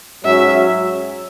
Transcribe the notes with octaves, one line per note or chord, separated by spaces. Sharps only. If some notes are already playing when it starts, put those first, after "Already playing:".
G#2 F#3 C#4 F#4 E5